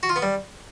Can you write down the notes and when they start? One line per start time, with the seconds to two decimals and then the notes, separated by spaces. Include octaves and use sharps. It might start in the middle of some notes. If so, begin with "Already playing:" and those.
0.03 F#4
0.09 F4
0.16 B3
0.22 G3